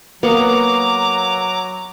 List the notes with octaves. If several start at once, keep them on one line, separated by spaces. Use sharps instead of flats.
F#3 A#3 B3 F#5 A#5 D6